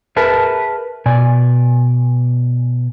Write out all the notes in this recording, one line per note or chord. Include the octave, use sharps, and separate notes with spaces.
G#4 A#4 B4 E5 A5
B2 D5 G#5